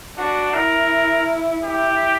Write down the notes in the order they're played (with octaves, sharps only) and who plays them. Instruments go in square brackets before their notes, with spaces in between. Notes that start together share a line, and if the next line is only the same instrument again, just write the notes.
[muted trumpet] D4 [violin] F#4
[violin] E4 [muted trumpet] A#4
[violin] E4 [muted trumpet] G4